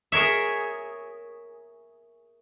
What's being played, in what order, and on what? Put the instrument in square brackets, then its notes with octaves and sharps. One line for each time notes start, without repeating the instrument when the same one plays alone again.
[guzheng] G#4 A#4 C#5 E5